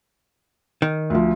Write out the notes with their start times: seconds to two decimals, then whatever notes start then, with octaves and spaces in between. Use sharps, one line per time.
0.82 D#3
1.10 D2 F3